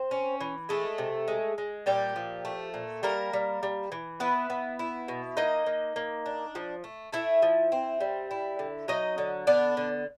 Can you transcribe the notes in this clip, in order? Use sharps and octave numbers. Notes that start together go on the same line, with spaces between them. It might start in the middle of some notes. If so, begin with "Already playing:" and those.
Already playing: C4 C5
C#4
E3
G#3 A3 A4
C3
G#3
G#3
A#2 G3 G4
F3
A3
A#2
G3 A#3 A#4
G3
G3
E3
B3 E4 B4
B3
E4
B2
A#3 D#4 D#5
A#3
A#3
D4
F3
A3
A3 E4 E5
F3
C4
G3
E4
D3
F#3 D#4 D#5
D3
B3 D4 D5
D3